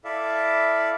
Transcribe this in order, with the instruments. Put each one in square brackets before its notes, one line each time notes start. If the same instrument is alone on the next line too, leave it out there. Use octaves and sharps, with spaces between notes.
[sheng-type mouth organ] E4 A4 D5 E5 F5